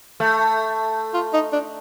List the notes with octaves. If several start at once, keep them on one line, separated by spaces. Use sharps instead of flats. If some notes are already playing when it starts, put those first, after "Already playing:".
A3
F4
D#4
D4